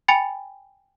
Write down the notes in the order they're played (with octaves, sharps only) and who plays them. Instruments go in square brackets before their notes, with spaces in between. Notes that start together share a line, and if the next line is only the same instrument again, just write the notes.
[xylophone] G5 G#5 B5 A6 C#7 F7